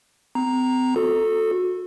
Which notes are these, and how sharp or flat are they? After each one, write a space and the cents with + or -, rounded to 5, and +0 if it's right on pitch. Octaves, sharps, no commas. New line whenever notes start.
C4 -40 A#5 +0
F#4 -30 A4 +0